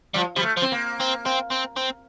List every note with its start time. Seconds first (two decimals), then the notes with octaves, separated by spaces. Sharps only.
0.14 F3 G3
0.36 F3 G3
0.43 A3
0.57 F3
0.62 C4
0.72 A#3
1.00 C4
1.26 C4
1.51 C4
1.77 C4